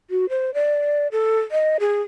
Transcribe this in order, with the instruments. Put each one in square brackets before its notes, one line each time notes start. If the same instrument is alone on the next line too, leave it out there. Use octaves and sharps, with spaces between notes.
[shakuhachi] F#4
C5
D5
A4
D#5
G#4